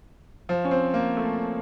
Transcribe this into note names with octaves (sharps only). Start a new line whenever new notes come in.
F3
C#4
C4
A#3
A3